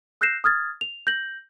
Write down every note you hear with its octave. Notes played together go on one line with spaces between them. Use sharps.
E6 F#6 G6 A#6 C7 E7
D#6 F6 G#6 A6
F7
G6 A#6 F#7